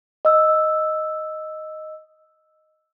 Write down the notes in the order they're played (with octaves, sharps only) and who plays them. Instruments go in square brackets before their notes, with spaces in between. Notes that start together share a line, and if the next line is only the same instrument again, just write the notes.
[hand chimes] D#5 E6